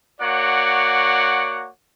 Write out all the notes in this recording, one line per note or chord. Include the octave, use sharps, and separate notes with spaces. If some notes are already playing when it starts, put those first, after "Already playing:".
A#3 F#4 C#5 D5 F#5